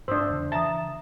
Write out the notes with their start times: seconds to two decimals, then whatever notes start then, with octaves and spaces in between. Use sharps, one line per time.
0.08 G#2 D4 C5 D#6 E6
0.29 E2 C#3
0.52 C#3 E3 E5 A5 A#5 D#6